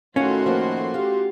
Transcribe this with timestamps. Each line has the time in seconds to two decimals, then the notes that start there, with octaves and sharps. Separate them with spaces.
0.16 A2 D#3 A3 C#4 F4 F#4 C6
0.46 F3 A#3
0.94 F4 G4